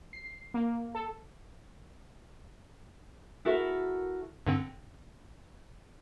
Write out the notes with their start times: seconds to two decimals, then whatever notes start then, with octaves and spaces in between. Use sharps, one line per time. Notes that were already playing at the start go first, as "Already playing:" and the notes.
0.13 C7
0.54 A#3
0.95 A4
3.45 E4 F#4 A4 A#4 E5
4.47 G2 D3 C4